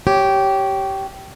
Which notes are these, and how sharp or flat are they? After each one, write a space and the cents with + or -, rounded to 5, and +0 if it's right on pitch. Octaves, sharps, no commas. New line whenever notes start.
G4 -15 C#5 +0